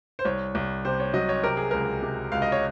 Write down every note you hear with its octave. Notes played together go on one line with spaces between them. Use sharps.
C5
C2 C#5
C2
C3 C5
C#5
F#3 D#5
C#5
C3 A#4
G#4
C#2 A#4
C3
C#2 F5
D#5
C#5